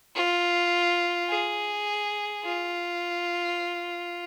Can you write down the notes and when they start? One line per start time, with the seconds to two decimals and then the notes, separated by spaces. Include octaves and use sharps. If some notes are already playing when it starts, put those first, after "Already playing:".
0.16 F4
1.30 G#4
2.44 F4